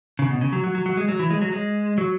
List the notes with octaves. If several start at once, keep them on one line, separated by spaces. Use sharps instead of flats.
C#3
B2
C#3
F#3
F#3
F#3
F#3
G#3
F#3
E3
G#3
F#3
G#3
F#3